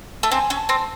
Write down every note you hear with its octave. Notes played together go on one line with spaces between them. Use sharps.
A3
C4 G#5
C#4
A5
C4